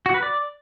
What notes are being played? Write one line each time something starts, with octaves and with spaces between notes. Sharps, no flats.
F#4
B4
D5